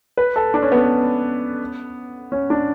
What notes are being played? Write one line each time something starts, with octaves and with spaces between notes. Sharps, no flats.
B4
A4
D4
C#4
B3
C#4
D4